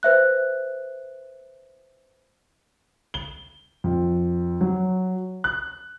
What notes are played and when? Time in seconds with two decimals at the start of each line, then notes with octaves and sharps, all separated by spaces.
0.03 B4 C5 E5 F#6
3.14 G7
3.84 F2
4.61 F#3
5.44 F#6